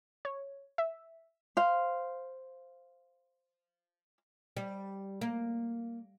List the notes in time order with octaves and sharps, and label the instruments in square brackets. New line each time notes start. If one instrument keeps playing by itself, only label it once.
[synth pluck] C#5
E5
[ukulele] C5 F5
[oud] G3
A#3